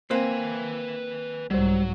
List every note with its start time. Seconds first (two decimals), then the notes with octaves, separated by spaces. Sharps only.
0.11 A#3 C4 B4 G#5
1.51 C2 G#2 F#3 G3 C5